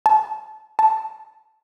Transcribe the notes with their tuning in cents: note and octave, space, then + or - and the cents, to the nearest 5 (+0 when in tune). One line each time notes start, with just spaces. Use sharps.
A5 -20
A5 -5